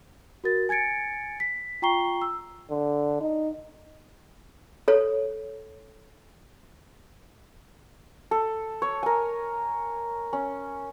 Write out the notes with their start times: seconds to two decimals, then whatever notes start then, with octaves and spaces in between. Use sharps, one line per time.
0.44 F#4 A#4 A6
0.69 G#5 G#6 A6 C#7 D7
1.40 B6
1.82 F4 G5 A#5 C#6 C7 G7
2.22 E6
2.71 D3
3.21 D#4
4.88 A4 C#5
8.31 A4
8.82 C#5
9.03 A#4 G#5
10.33 C#4